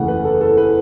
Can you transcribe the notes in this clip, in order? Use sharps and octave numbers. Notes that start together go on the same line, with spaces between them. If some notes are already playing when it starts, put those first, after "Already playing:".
Already playing: F#1 E2 C#3 A3 F#5
B4
A4
A4
B4